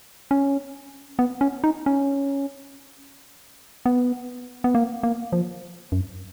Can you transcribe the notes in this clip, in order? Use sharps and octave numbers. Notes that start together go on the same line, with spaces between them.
C#4
B3
C#4
D#4
C#4
B3
B3
A#3
A#3
F3
F#2